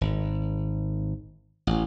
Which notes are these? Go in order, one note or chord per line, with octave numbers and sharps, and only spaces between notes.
G#1
A1